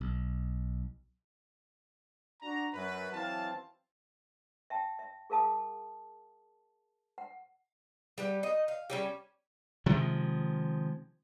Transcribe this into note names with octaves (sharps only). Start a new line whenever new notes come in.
B1
D4 F#4 A#5
F#2 B4
E3 F#3 C4 F5 A5
E5 G5 A5
E5
G#4 A#4 F5 A5 D#6
F#5
G3 G4 B4
D#4 D#5
F5
G3 C#4 G4
C3 D#3 F3 G#3